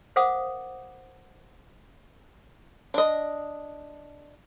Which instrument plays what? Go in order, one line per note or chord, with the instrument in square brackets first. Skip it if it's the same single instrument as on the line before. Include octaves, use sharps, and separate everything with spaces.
[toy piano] A#4 C5 F5 F#5 D6 D#6
[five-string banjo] D4 D#5